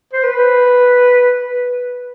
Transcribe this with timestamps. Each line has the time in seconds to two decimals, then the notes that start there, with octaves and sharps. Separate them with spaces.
0.13 C5
0.23 B4